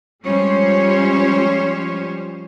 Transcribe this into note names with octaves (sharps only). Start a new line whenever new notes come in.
F3 G3 G#3 C#4 C5 C#5